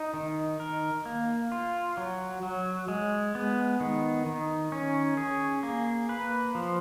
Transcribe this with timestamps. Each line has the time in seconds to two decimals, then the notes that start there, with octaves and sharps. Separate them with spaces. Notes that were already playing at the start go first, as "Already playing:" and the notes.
Already playing: D#4
0.14 D#3
0.60 A#4
1.06 A#3
1.52 F4
1.97 F#3
2.43 F#3
2.88 G#3
3.35 B3
3.80 D#3
4.26 D#3
4.72 C#4
5.17 G#4
5.63 A#3
6.09 B4
6.55 F3